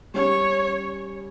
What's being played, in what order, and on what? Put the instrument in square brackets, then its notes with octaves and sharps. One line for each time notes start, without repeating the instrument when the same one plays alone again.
[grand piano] G3 C#4 G4 [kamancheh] C#5